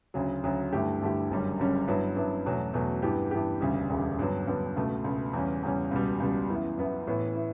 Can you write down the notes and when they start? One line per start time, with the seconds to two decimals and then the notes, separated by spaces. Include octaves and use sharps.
0.14 D2 C#3 F#3
0.44 D2 C#3 F#3
0.72 G2 D3 A3 E4 G4
1.01 G2 D3 A3 E4 G4
1.30 F#1 F#2 D3 G3 C#4
1.59 F#1 F#2 D3 G3 C#4
1.88 G2 F#3 B3 E4
2.16 G2 F#3 B3 E4
2.46 E2 B2 F#3 A3
2.74 E2 B2 F#3 A3
3.02 G2 E3 B3 E4 G4
3.31 G2 E3 B3 E4 G4
3.61 E1 D2 C#3 G3
3.89 E1 D2 C#3 G3
4.19 G2 D3 F#3 B3
4.47 G2 D3 F#3 B3
4.76 C#2 B2 A3
5.04 C#2 B2 A3
5.33 E2 C#3 G3 C#4
5.63 E2 C#3 G3 C#4
5.91 C#2 B2 G3
6.20 C#2 B2 G3
6.49 F#2 E3 B3 E4
6.78 F#2 E3 B3 E4
7.07 A2 E3 B3 E4
7.35 B3 E4